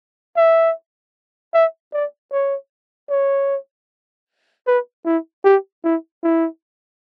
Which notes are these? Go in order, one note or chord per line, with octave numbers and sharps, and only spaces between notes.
E5
E5
D5
C#5
C#5
B4
E4
G4
E4
E4